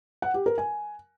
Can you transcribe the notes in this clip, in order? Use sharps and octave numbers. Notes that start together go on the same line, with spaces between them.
F#5
G4
A#4
G#5